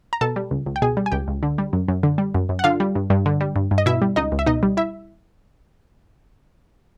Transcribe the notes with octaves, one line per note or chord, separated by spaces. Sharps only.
A#5
B2 A4 A5
G3
C#2
C#2
G5
B2 G#4 G#5
G3
G#5
C#2 G4 G5
C#2
D3
G3
F#2
F#2
D3
G3
F#2
F#2
F#5
D3 F4 F5
G3
G2
G2
D3
G3
G2
G2
D#5
B2 E4 E5
G3
C#2 D#4 D#5
C#2
E5
B2 D#4 D#5
G3
E4 E5